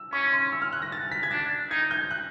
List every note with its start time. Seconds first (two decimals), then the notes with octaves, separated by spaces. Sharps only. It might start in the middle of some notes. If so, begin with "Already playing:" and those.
Already playing: E6
0.13 C#4 C#6
0.33 C6
0.52 E6
0.62 F6
0.73 F#6
0.82 A#6
0.92 A6
1.12 B6
1.23 G#6
1.31 D4 A6
1.70 D#4 G#6
1.91 G6
2.11 F#6